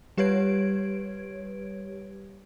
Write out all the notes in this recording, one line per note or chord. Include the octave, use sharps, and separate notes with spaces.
G3 G4 B4 C#5 G#6 D7